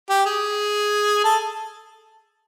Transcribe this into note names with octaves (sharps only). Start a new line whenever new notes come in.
G4
G#4
A4